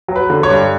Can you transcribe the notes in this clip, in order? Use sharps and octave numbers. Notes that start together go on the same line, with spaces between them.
F#3
B4
D3
C#5
G2